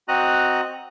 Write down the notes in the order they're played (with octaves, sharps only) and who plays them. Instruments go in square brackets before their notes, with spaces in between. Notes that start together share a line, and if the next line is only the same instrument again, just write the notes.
[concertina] C4 F#4 D#5 A#5 F#6